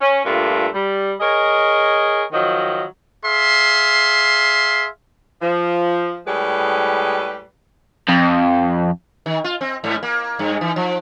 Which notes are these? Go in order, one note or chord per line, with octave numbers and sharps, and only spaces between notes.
C#4
G2 A#2 A3 F4
G3
G#4 A#4 C#5 D#5
D#3 F3 F#3 D#5
G#4 E5 F5 C6
F3
A2 G3 G#3 G#4 B4
F2
D#3
F4
C4
G#2
A#3
G2
E3
F3